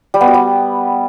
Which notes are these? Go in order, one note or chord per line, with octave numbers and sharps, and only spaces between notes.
G3
B3
F#4
G3